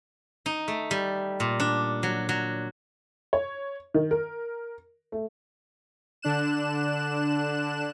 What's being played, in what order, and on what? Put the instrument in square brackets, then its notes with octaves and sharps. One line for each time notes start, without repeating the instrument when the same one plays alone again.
[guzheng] D#4
A3
G3
A#2
D4
F#3
F#3
[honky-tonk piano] C#5
D#3
A#4
A3
[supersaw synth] D3 D4 F#6 E7